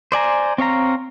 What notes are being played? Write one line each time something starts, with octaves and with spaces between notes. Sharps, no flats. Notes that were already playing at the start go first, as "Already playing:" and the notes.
C5 D5 G#5 A#5
C4 C#5 F5 A#5